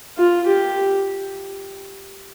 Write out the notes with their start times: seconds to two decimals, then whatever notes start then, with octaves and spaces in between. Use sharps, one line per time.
0.18 F4
0.46 G4